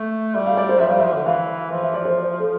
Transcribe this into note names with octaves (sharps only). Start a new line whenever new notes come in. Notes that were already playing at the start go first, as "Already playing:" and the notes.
Already playing: A3
G3 E5
F5
D5
C5
F3 E5
G3 F5
F3 E5
D3
E3 F5
F3 E5
E5
D5
C5
D5
A4